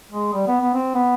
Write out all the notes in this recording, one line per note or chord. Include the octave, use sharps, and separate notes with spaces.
G#3
G3
B3
B3
C4
B3